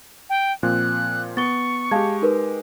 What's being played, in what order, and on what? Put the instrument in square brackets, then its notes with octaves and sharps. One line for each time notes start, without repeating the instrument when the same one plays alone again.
[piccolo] G5
[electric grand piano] A#2 F3 C4 [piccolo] F#6
[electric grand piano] B3 [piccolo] C#6 [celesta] A6 G7
[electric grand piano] G#3 G4 [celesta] F5 A5 G#6
[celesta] D#4 A#4 B4